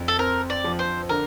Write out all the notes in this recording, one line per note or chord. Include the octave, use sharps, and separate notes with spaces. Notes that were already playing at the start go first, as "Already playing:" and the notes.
Already playing: F2
A4
C4 A#4
D5
F3
C5
D3 A#4